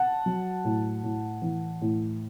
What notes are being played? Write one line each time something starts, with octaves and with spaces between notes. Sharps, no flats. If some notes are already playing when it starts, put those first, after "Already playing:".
Already playing: F#5 A5
F#3
A2
A2
E3
A2